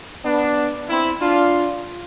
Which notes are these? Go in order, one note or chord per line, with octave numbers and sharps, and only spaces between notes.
B3 D4
C4 E4
D4 F4